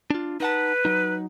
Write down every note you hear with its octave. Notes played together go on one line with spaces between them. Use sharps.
D4 F4
D#4 B4 F#5 A5
F#3 D#4